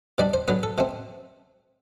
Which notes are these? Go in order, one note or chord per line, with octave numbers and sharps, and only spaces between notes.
B2 G3 D4 D5
C5
D3 F#3 B3 B4
A4
B2 A3 C4